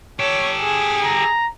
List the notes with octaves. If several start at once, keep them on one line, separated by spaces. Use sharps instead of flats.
G4 A4 C#5
G#4
A#5